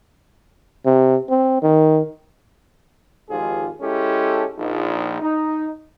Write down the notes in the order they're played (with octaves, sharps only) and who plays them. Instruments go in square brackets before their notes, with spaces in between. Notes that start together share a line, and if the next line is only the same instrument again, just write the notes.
[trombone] C3
C4
D#3
[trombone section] G#1 F2 G#2 F4 G4 G#4
G#3 C#4 E4 G4 A4
A#1 D#4
D#4